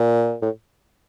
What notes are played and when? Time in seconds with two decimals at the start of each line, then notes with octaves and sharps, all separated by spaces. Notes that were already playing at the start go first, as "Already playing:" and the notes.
Already playing: A#2
0.42 A2